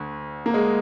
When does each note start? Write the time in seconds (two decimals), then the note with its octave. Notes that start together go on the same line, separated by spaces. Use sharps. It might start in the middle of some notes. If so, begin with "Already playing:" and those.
Already playing: D2 D3
0.46 A#3
0.54 G#3